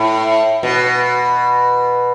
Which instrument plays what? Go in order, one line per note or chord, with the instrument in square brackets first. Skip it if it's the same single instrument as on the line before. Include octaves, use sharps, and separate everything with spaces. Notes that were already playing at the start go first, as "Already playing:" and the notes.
Already playing: [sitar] A2
B2